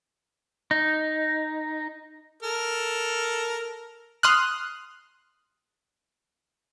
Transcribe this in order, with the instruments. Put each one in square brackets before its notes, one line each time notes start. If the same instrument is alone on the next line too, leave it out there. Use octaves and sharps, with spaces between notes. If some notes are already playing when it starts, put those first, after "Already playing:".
[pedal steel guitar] D#4
[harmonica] A4 A#4
[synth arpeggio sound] C6 D#6 F6 F#6